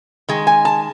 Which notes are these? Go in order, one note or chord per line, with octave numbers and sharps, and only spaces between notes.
D#3 G#3
G#5
A5